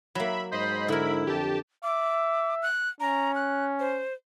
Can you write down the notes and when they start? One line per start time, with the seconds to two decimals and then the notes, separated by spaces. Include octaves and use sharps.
0.15 F#3 A#3 E5 B5
0.52 G#2 C5 D#5 B5
0.88 D3 E4 A#4
1.27 F2 G4 A5
1.83 E5 D6
2.62 F#6
3.00 C#4 A#5
3.35 F#6
3.80 C5